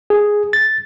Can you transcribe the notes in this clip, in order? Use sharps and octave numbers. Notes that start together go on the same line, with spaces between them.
G#4
A6